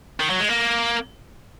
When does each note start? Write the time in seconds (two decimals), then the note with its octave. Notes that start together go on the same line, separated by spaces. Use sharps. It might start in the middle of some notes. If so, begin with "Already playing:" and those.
0.20 D#3
0.30 F#3
0.40 G#3
0.50 A#3